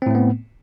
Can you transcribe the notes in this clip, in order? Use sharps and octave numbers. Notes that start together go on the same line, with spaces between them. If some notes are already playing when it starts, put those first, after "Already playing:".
A2 A3 B3 C4